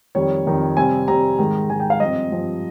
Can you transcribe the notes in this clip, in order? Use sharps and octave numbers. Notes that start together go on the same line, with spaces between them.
F2 D#3 G3 C#5
F2 D#3 G3
C3 G3 C4 G#5
C3 G3 C4 A#5
G#2 D#3 G#3
G#2 D#3 G#3 G#5
G5
F5
G2 F3 C4 D#5
G2 F3 C4